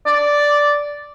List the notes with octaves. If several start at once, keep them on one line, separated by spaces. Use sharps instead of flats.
D5